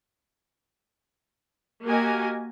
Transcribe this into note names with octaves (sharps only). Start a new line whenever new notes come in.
A#3 F#4 G4 A#4 D#5 G#5